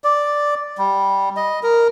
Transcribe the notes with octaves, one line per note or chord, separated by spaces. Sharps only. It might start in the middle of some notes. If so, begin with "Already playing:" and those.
D5
G3
D#5
A#4